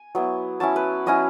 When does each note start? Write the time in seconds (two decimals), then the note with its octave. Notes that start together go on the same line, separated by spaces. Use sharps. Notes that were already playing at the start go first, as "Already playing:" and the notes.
Already playing: G#5
0.15 F#3 B3 E4
0.60 F#3 C#4 E4 A5
0.76 B4
1.06 F#3 C#4 E4 D#5